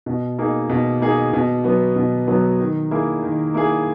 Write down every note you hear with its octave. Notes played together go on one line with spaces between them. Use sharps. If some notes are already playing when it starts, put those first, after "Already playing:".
B2
A#3 D#4 G#4
B2
A#3 D#4 G#4
B2
F#3 B3
B2
F#3 B3
D#3
A#3 E4 G#4
D#3
A#3 E4 G#4